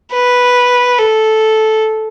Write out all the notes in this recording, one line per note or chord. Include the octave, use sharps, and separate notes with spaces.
B4
A4